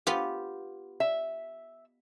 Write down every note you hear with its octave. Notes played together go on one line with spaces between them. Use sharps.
B3 F4 G4
E5